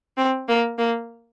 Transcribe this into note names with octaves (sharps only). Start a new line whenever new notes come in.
C4
A#3
A#3